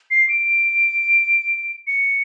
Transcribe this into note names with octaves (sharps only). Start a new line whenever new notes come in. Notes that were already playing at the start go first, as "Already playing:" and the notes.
C7
D7
C#7